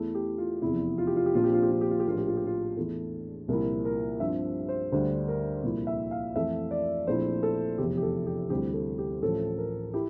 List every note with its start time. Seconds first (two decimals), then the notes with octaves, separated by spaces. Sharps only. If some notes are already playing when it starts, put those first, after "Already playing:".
Already playing: E2 E3 A3 E4
0.15 G4
0.38 F4
0.62 F1 E2 C3 E4
0.98 F4
1.07 G4
1.16 F4
1.26 G4
1.34 A#1 A#2 F3 C4 F4
1.44 G4
1.54 F4
1.63 G4
1.71 F4
1.81 G4
1.91 F4
2.00 G4
2.05 A#1 A2 F3 A#3 F4
2.18 G4
2.27 F4
2.37 G4
2.46 F4
2.77 E2 E3 A3 E4 A4
3.48 C2 A#2 F3 A#3 E4 A#4
3.85 A#4
4.20 G2 F3 C4 E5
4.69 C5
4.92 D2 D3 G3 D4 C5
5.28 A#4
5.63 C2 A#2 F3 A#3 E4
5.87 E5
6.11 F5
6.35 F2 E3 A3 E5
6.71 D5
7.07 A#1 A#2 A3 C4 E4 C5
7.43 A4
7.78 F1 E2 E3 G4
7.97 G4
8.02 A4
8.26 G4
8.50 D2 C3 G3 C4 E4 G4
8.74 A4
8.98 G4
9.22 A1 A2 F3 A3 A4
9.58 A#4
9.94 E4 G4